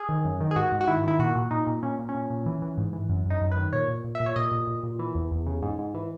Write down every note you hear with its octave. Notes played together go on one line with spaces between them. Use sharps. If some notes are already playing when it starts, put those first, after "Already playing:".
Already playing: G#4
D#3
F#2
D#3
G#4
G#2 F#4
G#2
F#4
D#3 E4
D#3 E4
A#2 F#4
A#2
A#2 D#4
A#2
A#2 C#4
A#2
C#4
A#2
A#2
E3
E3
G#2
E3
F#2
F#2
D#4
F#2
D#3 B4
A#2 C#5
A#2
A#2
A#2 E5
C#5
A#2 D#5
A#2
A#2
A#2
E3
E2
E2
C#3
G#2
G#2
E3